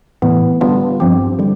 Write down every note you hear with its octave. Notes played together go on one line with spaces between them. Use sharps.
A2 E3 B3
D3 G3 B3 D4 F4
G2 F3 C4 G4
D3 G3